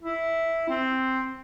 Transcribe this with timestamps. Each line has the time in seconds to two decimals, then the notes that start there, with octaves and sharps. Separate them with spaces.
0.03 E4
0.69 C4